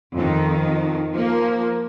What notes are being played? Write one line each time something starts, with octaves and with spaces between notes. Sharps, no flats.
F2 D#3
F3 A#3